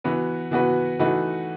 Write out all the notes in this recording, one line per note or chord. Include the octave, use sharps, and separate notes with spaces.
E3 B3 F#4 B4
E3 B3 F#4 B4
E3 A3 D#4 F#4 B4